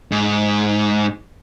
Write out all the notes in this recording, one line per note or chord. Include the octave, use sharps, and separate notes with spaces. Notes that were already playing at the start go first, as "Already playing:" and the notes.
G#2